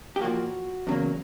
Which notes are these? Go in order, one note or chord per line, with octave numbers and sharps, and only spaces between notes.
G4
A#2 F3 A#3 F#4
E2 C#3 F#3 A#3